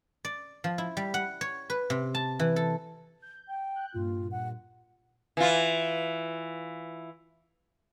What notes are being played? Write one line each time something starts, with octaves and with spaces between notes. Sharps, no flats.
D5
F3
E4
G3
F#5
C#5
B4
C3
A5
E3
A4
G6
G5
F#6 G6
G2 A#2 F4
F#5
E3 F4